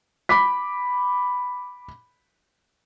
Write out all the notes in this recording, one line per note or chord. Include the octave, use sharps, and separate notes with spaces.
B5 D6 B6